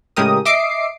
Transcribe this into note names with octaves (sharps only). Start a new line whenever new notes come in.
A2 C#3 G#3 G4 A#4 D#6
D#5 E5 D6 C7 D7